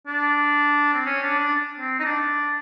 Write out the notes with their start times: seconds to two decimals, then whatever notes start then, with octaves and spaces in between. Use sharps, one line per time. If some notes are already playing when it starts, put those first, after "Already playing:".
0.07 D4
0.94 C4
1.06 C#4
1.23 D4
1.38 D4
1.80 C4
1.99 D#4
2.04 D4